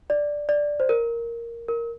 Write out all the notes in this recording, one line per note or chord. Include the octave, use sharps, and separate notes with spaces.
D5
D5
C5
A#4
A#4